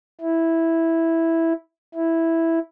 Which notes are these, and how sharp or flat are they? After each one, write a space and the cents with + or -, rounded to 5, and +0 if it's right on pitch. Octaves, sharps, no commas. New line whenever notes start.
E4 -5
E4 -5